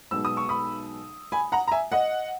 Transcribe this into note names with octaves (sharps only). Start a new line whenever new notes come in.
B1 B2 G#3 E6
D#6
C#6
B5 D#6
G#5 B5
F#5 A#5
A#5
E5 G#5
D#5 F#5